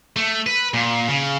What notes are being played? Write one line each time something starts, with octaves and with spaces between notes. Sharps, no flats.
A3
B4
A#2
C#3